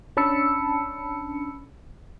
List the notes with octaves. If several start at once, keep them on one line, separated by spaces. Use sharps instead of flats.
C#4 D4 A5 B5 E6 C#7